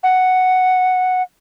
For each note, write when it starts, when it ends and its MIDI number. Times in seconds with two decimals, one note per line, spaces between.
0.03 1.22 78